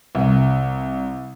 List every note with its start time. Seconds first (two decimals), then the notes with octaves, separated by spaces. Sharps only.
0.15 C2